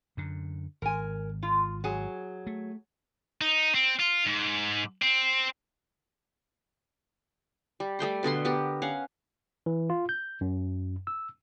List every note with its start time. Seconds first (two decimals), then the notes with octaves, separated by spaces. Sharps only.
0.17 F#2 D3
0.82 G#1 A#4 G#5
1.43 F4
1.84 F#3 G#4 G#5
2.47 A3
3.41 D#4
3.75 C4
3.99 F4
4.26 G#2
5.02 C4
7.80 G3
7.99 G3 A3 G5 C6
8.23 B2 D3 A3 C6
8.45 B3 G4 A#4
8.82 C#4 F5 F#5
9.66 E3
9.90 F4
10.09 G6
10.41 F#2
11.07 E6